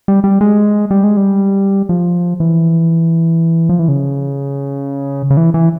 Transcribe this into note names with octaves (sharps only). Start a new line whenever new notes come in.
G3
G3
G#3
G3
G#3
G3
F3
E3
F3
E3
C#3
C#3
E3
E3